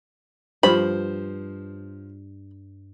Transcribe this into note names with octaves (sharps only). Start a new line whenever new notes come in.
G2 F3 C5 B5